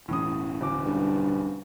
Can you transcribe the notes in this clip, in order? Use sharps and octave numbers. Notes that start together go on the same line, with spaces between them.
E1 A2 E3 C#4 D#6
D1 D6
G2